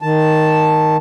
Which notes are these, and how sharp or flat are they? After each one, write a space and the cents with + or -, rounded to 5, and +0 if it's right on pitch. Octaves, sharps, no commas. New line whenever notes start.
D#3 +0 A5 +0